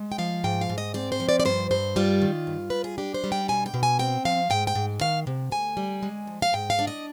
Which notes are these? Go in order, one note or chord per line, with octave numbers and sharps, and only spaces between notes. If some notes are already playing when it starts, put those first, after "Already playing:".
Already playing: G#3
G5
F3 F5
G#2 G5
F5
G#2
D#5
C4 D5
C5
F3
D5
D5
G2 C5
G2 C5
G3 F4
D#3
G2
G2 B4
G#4
D4 G4
C5
G3
G5
B2 G#5
G5
B2
G#5
C4 G5
F3 F5
G#2 G5
G5
G#2
D#3 F5
C3
D2 G#5
G3
G#3
F3
F5
G#2 G5
F5
D4
D#5